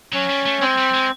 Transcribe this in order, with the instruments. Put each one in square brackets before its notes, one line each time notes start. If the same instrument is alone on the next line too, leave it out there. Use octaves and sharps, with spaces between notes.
[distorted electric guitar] F#3 [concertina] C#4
[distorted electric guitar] G3
A3
[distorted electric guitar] G#3 [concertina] C4
[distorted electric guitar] G3
G#3